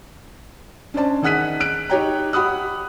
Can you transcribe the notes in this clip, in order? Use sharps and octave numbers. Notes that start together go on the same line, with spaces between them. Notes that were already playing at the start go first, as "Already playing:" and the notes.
C#4 D4 C5 D5 A5
D#3 G#4 F#5 F#6 B6 D#7
F#6 D7
D#4 G4 C#5 G5 A#5
G4 F#5 B5 D#6 F#6